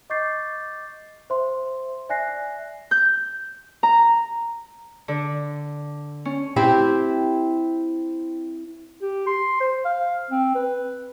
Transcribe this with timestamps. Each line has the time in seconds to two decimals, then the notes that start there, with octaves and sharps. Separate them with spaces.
0.10 D#5 C#6 D6 G6 A6 C7
1.30 C5 E5 C6
2.09 D5 E5 G#5 F#6 A#6 C7
2.91 G6
3.83 A#5
5.08 D3
6.25 C#4
6.56 C4 E4 G4
9.01 G4
9.27 C6
9.60 C5
9.85 F5
10.30 C4
10.55 B4